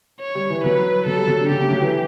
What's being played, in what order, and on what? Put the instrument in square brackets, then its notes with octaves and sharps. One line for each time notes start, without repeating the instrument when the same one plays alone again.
[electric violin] C#5
[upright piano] G3
E3
[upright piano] F#3 [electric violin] B4
[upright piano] F#3 [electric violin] A4
[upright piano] G3
F#3
D3
[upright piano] C#3 [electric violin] G4
[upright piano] A3
F#3
E3